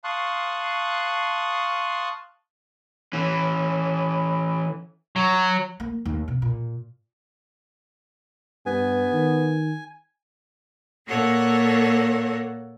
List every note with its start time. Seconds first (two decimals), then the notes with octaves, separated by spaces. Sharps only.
0.04 F5 A5 C6 C#6 D#6 F#6
3.13 E3 C#4
5.16 F#3
5.80 A#3
6.05 D#2
6.28 C3
6.42 A#2
8.66 G2 B3 G#5
9.12 D#3
11.06 A#2 A#3 A4 C#5 F#5